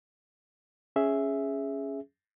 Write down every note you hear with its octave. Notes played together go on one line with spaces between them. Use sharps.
C#4 G#4 E5